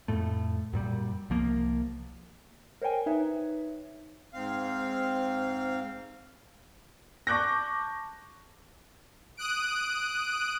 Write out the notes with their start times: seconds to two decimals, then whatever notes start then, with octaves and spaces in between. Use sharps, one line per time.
0.08 F2 A2 A3
0.73 F#2 A#2 G3
1.30 C2 F3 A#3
2.82 A#4 C5 C#5 G5 G#5
3.06 D#4 B4 C#5 E5
4.33 G#2 C4 F5
7.27 A5 C#6 D6 F#6 G6 A#6
9.37 D#6 F#6 D7